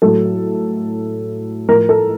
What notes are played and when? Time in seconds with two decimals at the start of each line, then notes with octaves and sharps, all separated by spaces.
0.02 A2 F#3 A4
1.68 A2 F3 A#4
1.89 A4